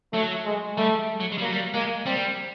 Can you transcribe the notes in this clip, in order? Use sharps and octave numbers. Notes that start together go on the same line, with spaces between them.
F#3 A3
G#3
G3 A3
F#3
G#3
G3
F#3 A#3
G3
G#3 A#3
G3 C4